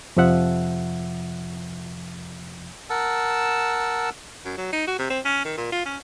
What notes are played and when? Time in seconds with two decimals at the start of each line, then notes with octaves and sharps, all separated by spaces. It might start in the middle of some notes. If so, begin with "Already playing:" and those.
0.17 F2 C3 F3 E5 F#5
2.90 A#4 F#5 A5 E6
4.45 F#2
4.58 F#3
4.73 D#4
4.88 F#4
4.99 C3
5.10 C4
5.25 C#4
5.45 D#3
5.57 A#2
5.72 F4
5.86 C#4